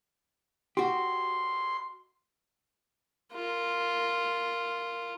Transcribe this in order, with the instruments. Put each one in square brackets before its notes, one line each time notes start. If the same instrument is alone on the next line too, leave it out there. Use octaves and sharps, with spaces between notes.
[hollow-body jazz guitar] F#4 G4 [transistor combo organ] C6
[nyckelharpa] F4 A#4